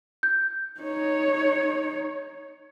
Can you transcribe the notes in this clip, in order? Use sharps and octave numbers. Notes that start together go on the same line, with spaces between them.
G6
D#4 C#5